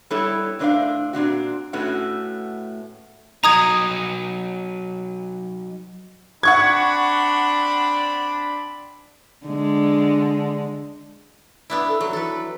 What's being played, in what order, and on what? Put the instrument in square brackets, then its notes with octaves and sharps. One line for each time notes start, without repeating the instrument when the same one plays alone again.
[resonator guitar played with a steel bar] G3 B3 E4 A4 C#5
A2 C3 D4 B4 C5 F5
A#2 C4 D4 F#4
A2 A3 B3 C#4 F#4
[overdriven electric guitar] F#3 D#4 [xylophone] A#5 D#6 G#6
[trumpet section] C4 D4 B5 [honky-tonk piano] F#5 C#6 G#6
[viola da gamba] D3 G#3
[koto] B3 D4 E4
[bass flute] A4
[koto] F#3 [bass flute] D#4
[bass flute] E3 [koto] A4 B4